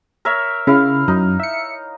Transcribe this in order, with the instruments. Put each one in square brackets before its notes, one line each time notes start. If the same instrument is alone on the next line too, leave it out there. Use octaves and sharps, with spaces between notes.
[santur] A#4 C#5 E5
[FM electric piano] C#3 [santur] E4 F5
[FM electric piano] F#2 [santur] D#4
[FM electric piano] E5 C#7